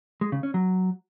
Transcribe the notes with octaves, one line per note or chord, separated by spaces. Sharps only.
G#3
C#3
C#4
F#3